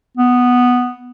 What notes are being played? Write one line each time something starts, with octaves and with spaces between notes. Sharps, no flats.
B3